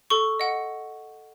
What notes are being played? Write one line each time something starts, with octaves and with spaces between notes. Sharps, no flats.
A4 C#6
D#5 F#5